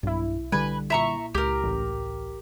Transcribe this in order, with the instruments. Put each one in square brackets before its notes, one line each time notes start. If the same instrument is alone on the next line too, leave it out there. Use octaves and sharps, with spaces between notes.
[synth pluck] B1 E4 [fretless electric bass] G2
[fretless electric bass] D3 G3 [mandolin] B4 G#5
[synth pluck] A#2 E4 [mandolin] E5 A#5 C#6
[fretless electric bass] C#2 [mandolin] G4 A#4
[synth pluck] A1